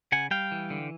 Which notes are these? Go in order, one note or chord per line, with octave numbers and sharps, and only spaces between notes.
C#3 F#5 G#5
G3 F5 G5
E3
D3